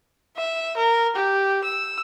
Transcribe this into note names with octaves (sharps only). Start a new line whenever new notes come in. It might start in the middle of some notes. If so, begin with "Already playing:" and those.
E5
A#4
G4
E6